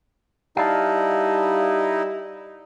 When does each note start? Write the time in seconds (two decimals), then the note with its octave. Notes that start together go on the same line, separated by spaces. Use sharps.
0.57 G3 D#4 E4 F5 A5